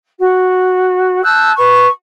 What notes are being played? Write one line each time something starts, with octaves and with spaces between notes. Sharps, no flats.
F#4
A5 E6 F#6 G6
B4 C#6